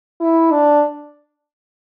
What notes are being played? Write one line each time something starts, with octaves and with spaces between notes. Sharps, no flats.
E4
D4